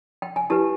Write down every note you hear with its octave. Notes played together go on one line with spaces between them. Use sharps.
G5
G#5
E4 G4 B4 A5